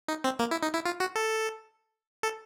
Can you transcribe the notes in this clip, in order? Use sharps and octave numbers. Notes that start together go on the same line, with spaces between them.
D#4
C4
A#3
E4
D#4
E4
F4
F#4
A4
A4